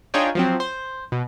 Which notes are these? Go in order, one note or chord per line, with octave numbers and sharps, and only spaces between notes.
D4 D#4 F4 G#4 C#5 G5
F3 F#3 C4
C5
B2